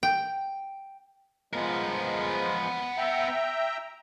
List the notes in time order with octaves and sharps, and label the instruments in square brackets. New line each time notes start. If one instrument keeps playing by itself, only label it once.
[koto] G5
[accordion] F3 G#3 [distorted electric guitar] B3 A#4
[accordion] E5 G5 A#5